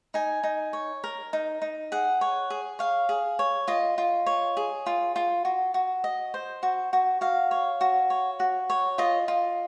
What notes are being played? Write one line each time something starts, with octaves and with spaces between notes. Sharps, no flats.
D#4 G#5
D#4
C#5
A#4
D#4
D#4
G#4 F#5
C#5
G#4
C#5 F5
G#4
C#5
F4 D#5
F4
C#5
G#4
F4
F4
F#4
F#4
D#5
C5
F#4
F#4
F#4 F5
C#5
F#4
C#5
F#4
C#5
F4 D#5
F4